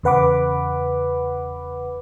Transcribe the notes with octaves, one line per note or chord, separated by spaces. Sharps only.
E2 C#3 B4 F#5 B5 D6